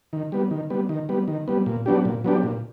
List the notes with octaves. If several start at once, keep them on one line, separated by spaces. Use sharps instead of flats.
D#3
G3 B3
D#3
G3 B3
D#3
G3 B3
D#3
G3 B3
A#2
F#3 B3 D4 G4
A#2
F#3 B3 D4 G4
A#2